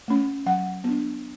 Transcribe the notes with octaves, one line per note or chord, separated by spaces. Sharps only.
A3 C#4
F#3 F#5
B3 D4